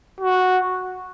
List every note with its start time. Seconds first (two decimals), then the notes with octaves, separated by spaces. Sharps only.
0.20 F#4